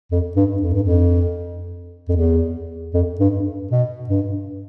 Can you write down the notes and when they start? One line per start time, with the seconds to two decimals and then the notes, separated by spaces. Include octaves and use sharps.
0.11 F2
0.36 G2
0.62 F2
0.74 G2
0.83 F2
2.09 F2
2.17 E2
2.94 F2
3.20 G2
3.72 B2
4.09 G2